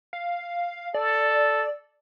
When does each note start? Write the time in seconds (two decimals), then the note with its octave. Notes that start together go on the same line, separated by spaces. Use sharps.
0.13 F5
0.94 A4 D5